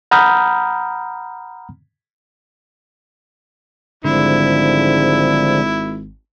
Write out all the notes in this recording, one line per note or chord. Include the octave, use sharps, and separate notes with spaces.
F#5 A#5 B5 D#6 F6 G6
G#1 G#2 D3 F3 G3 E4